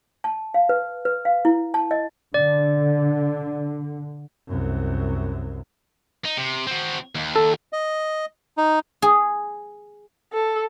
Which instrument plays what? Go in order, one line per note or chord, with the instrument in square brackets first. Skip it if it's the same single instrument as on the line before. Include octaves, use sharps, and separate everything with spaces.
[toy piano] A5
F5
B4
B4
F5
E4
A5
D#5
[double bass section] D3 [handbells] D5
[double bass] C2 F#2
[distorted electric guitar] D#4
C3
C4 F#4
D#2
[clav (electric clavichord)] A4
[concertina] D#5
D#4
[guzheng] G#4
[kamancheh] A4